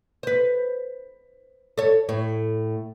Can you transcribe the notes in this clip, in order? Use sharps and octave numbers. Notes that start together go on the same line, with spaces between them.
B4 C5
A4 C#5
A2 C#5